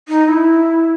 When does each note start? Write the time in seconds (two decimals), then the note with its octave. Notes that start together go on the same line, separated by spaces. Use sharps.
0.08 D#4
0.28 E4